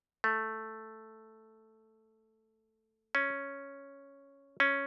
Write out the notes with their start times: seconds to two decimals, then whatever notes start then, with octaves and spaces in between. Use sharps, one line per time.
0.24 A3
3.15 C#4
4.60 C#4